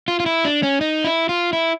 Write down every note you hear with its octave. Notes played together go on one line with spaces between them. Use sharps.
F4
F4
E4
D4
C#4
D#4
E4
F4
E4